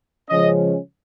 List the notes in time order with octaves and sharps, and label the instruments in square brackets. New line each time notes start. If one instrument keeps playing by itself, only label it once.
[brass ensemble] C#3 F3 G#3 C#4 D#5